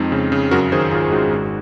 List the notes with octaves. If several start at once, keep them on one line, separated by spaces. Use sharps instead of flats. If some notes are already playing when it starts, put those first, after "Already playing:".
Already playing: F2 G#3 C4 D#4
C#3
C#3
F#2 F#4 A#4
D#3 G#4 C5
G#1 F4 G#4
G#3 D#4 F#4
G#1